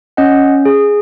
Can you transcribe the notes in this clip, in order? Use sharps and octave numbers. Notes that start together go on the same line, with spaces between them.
C#4 D#5 F#5
G#4